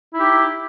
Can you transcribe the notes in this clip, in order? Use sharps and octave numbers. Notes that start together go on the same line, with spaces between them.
D#4 E4 G4